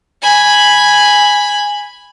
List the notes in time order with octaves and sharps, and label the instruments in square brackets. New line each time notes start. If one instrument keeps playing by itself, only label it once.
[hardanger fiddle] G#5 B5